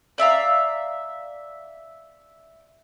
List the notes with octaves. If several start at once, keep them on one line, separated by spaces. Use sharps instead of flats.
D5 E5 F5 A#5